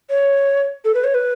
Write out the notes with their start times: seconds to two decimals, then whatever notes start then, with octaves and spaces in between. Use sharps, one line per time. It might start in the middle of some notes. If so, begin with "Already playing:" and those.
0.10 C#5
0.85 A4
0.94 B4
1.04 C#5
1.15 B4